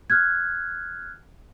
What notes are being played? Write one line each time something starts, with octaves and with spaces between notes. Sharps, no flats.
F6 F#6 G#6